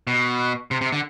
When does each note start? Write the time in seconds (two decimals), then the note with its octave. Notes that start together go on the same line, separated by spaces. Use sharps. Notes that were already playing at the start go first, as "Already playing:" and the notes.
0.07 B2
0.71 C3
0.81 C3
0.92 D3